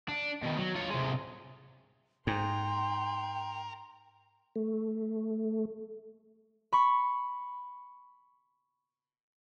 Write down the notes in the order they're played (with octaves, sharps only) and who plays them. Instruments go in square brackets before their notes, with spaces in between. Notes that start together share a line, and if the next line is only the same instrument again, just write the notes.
[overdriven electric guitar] D4
B2 D#3
F#3
F4 C#5
C3 G#3
[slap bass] G#2 [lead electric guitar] A#4 [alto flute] G5 [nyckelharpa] C6
[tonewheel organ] A3
[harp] B5 C#6